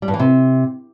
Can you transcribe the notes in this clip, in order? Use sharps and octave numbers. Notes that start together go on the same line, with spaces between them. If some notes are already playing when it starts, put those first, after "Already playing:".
G3
G2
E3
C3